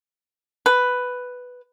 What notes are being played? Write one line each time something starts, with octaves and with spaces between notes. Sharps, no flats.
B4